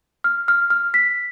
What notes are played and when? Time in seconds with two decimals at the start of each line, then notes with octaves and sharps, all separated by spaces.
0.24 F6
0.48 F6
0.70 F6
0.94 B6